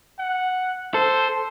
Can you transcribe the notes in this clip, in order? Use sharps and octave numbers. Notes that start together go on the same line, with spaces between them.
F#5
A4 C5